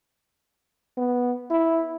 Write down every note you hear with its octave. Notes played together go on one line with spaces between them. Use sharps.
B3
E4